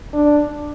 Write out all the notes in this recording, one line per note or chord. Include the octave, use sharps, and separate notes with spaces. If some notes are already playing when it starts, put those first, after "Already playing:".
D4